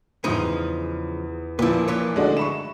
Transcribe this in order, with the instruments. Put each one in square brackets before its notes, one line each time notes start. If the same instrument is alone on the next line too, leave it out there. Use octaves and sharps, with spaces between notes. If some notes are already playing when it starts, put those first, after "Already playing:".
[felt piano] E2 D#6 D#7 [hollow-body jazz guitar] C#3 F3 D#4
[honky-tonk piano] A#2 F3 [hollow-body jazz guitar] E4 B4
[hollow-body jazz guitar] E3 B4 C#5
[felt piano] D3 A3 [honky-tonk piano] G#3 D4 F#4
[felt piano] E5 B5 C#6 [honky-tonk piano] E7